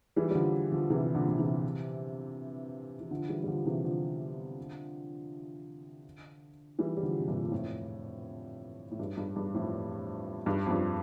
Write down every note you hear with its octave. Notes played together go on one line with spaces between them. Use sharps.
E3 G3
G3
D3 F3
D3 F3
C3 E3
A#2 D3
D3
C3 E3
E3
D3 F3
E3 G3
G3
D3 F3
C3 E3
D3 F3
E3 G3
G3
D3 F3
C3
G2 A#2
A#2
F2 A2
A2
G2
G2
G2
F2 A2
G2
F2
G2